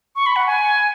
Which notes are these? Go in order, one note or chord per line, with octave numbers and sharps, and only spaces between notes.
C#6
B5
F#5
G#5